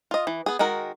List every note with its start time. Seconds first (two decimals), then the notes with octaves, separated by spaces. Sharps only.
0.11 F4 D#5
0.27 E3
0.46 B3 G#4
0.59 D#3 G#3 F#4 A#4